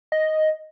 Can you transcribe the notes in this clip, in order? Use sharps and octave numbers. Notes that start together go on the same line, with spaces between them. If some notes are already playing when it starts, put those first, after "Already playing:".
D#5